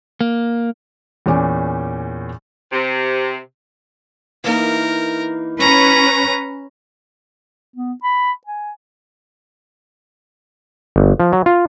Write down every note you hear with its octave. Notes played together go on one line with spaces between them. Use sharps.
A#3
E2 A#2 C#4 D6
C3
E3 A#3 D#4 A#4
C#4 B4 A#5
B3
B5
G#5
G1
F3
F#3
F4